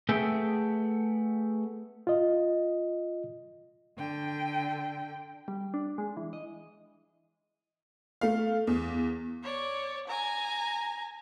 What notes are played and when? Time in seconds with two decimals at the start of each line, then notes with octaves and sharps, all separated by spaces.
0.09 A3 B3 G#4 A4 E5 G5
2.07 F4 D#5
3.98 D3 G5
5.48 G3
5.74 D4
5.98 G#3
6.17 E3
6.33 D#5
8.21 A3 F5
8.67 E2
9.43 C#5 D5
10.08 G#5 A#5